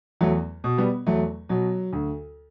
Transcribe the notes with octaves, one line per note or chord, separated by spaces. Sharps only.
E2 F#3 A3
B2
G3 B3
E2 F#3 A3
B2 F#3
D2